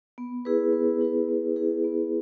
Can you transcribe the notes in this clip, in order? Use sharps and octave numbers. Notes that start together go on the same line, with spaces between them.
B3
E4 G#4 B4
B3
E4 G#4 B4
B3
E4 G#4 B4
B3